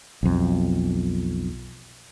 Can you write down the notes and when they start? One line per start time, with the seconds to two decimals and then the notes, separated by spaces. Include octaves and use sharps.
0.23 B1 F2